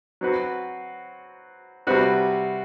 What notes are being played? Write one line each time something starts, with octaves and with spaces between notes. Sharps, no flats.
F#3 C4 F#4 B4
C3 G3 C4 F#4 B4